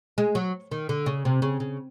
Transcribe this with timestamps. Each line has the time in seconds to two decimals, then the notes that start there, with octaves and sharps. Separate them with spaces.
0.18 G#3
0.35 F#3
0.71 D#3
0.89 D3
1.06 C#3
1.25 C3
1.42 C#3
1.60 C#3